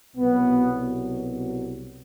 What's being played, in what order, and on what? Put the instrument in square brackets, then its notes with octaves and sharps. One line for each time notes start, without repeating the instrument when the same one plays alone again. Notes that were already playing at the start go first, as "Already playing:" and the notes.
[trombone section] C2 B2 F#3 B3